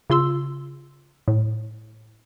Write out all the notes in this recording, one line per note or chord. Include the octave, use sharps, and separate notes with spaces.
C#3 F4 C6 E6
A2